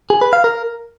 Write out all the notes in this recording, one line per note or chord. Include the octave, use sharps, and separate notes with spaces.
G#4
B4
F5
A#4